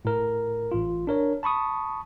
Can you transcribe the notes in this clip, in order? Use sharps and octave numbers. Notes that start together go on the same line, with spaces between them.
A2 A#4
A1 F4
D4 A#4 C#5
A5 B5 C#6 D#6